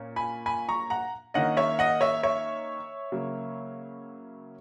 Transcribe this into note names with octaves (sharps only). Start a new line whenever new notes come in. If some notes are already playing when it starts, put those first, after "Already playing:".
Already playing: A#2 A#3 C#4
G#5 B5
G#5 B5
A#5 C#6
F#5 A#5
D#3 A#3 C#4 D#5 F#5
C#5 E5
D#5 F#5
C#5 E5
C#5 E5
C#3 F#3 A#3